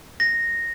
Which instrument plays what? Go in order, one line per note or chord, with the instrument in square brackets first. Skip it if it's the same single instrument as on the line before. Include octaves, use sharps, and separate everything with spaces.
[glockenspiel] A#6